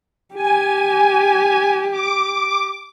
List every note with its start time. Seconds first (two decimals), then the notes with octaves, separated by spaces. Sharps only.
0.35 G4 G#5
1.91 D6